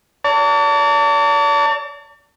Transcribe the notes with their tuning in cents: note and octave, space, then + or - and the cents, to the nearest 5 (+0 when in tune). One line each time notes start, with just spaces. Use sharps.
D5 -45 A5 +35